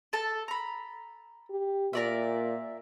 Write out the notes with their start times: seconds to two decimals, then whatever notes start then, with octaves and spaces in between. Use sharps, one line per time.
0.13 A4 A5
0.48 A#5 B5
1.50 G4
1.93 A#2 A#4 D5 E5